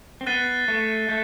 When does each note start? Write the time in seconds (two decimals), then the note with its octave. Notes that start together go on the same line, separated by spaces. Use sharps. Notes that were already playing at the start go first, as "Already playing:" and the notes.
0.21 C4
0.26 B3 F#6 A6 C7 D#7 G7
0.68 A3
1.09 A3 G6